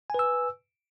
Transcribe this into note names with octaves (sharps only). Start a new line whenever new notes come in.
B4 G#5 E6